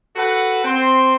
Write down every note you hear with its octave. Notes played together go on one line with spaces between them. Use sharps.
F#4 A4 B4 F#5
C4 C6